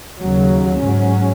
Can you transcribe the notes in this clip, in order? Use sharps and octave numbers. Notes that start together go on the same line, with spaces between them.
D#2 C#3 F#3
G#2 F#3 C#4